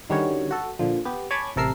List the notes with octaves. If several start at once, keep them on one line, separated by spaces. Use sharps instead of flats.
D3 D#3 G3 C#4 F#4 C#5
F#4 A4
A#2 D3 F3
B3 G4
C#5 G#5 A5 B5 D6 G#6
A1 C3 A4 A#4 E6 C7